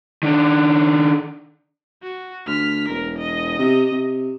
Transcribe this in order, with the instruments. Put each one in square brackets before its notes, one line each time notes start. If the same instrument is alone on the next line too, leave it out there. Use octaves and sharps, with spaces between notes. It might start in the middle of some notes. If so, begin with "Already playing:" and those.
[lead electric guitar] D#3 D4
[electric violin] F#4
[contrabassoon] D2 [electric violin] F6 B6
[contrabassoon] E1 [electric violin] A#4
[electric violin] D#5
[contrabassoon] C3
C3